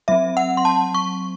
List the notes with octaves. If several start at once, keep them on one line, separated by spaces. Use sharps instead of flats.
F#3 C4 E5
F#5
C6
A5
C#6